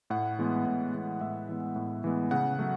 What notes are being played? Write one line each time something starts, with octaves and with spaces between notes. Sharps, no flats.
A2 F#5
E3 G#3 B3
A2
E3 G#3 B3
A2 E5
E3 G#3 B3
A2
E3 G#3 B3
C#3 F#5
F#3 A3